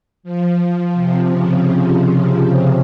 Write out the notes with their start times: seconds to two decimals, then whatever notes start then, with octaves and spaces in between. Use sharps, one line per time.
0.23 F3
0.59 F3
0.93 C3
1.28 C#3